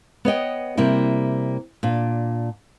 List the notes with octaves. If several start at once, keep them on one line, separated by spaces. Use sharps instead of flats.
B3 C#5 D#5 G5
C3 G3 A#3 E4
A#2 D4